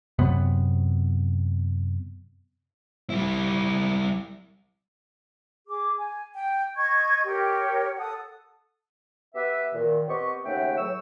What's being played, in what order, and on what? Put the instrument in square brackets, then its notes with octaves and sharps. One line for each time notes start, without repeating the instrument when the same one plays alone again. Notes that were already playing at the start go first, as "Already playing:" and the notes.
[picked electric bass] F#2 C3 B3
[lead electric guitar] G3 E4
[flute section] G#4 D6
G#5
G5
D#5 C#6 G#6
G4 A#4 C#5 G5
A4 F#5 D#6
[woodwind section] B3 G4 B4 E5
A#2 D#3
B3 C4 G4 D#5 C#6
D#2 C#3 A3 E5 F#5 G5
A2 E3 F#3 G#4 C#6 E6